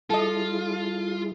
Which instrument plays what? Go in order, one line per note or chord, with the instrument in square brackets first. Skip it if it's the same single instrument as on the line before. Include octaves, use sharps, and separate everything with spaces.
[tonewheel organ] G3 E4 G#4 [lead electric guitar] F4 [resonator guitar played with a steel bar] A4 D#5